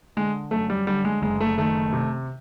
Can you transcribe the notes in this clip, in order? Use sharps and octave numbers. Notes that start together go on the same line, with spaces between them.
D3 G#3
F#2 A3
G3
D3 G3
G#3
F#1 G#3
A3
D#3 A3
C3